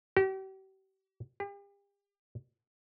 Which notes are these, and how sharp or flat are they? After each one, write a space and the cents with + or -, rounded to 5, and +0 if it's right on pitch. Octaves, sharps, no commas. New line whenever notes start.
G4 -40
G4 +40